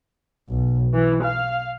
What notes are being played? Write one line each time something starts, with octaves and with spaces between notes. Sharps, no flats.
B1
E3
F5